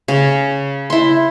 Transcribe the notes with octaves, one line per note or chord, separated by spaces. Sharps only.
C#3
E4 C6